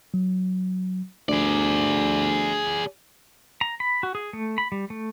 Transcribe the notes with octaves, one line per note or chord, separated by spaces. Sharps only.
F#3
D2 G#4 D5
A#5
B5
F#4
G#4
A3
B5
G3
A3